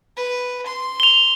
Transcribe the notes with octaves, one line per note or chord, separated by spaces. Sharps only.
B4
C6
F7 G7